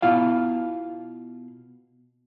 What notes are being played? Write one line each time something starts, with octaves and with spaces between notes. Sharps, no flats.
B2 E4 F4 F5